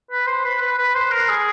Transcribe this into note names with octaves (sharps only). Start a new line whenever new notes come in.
B4
C5
B4
B4
B4
C5
A#4
G#4